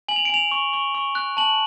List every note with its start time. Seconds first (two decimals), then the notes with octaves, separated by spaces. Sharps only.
0.08 G#5 F#7
0.16 F7
0.25 D7
0.30 G#5 F7
0.51 C#6
0.73 C#6
0.95 C#6
1.15 F#6
1.37 A5 F#7